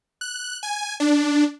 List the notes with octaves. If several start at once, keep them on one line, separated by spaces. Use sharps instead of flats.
F#6
G#5
D4